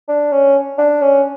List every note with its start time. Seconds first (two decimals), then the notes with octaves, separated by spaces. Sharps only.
0.08 D4
0.32 C#4
0.78 D4
1.02 C#4